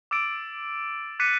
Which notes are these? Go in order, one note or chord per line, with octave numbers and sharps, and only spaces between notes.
D6 E6 A6 D7
D6 F#6 A6 B6 C#7 D#7